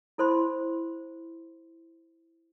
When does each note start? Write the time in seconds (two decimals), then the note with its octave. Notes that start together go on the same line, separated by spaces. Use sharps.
0.18 E4 A4 C5 B5 C6